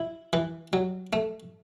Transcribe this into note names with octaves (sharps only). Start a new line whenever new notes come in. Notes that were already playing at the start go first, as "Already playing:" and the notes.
Already playing: E4
E3
F#3
A3